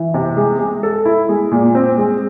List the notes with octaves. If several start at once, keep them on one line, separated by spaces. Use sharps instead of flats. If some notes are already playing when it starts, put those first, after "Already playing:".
Already playing: E3
C3
G#3
G#3
A4
E4
G#3
A#2
C4
G#3